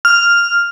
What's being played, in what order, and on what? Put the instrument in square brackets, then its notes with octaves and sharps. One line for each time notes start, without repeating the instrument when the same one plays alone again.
[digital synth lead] F6